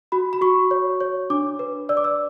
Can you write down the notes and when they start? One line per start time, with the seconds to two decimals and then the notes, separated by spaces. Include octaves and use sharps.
0.12 F#4 B5
0.33 B5
0.41 F#4 C#6
0.71 C#5
1.01 C#5
1.30 D4 D6
1.59 B4
1.89 D5 E6
1.97 D6
2.04 E6